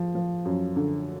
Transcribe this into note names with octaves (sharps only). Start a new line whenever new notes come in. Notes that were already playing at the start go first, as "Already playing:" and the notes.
Already playing: F3
F3
F#2
D3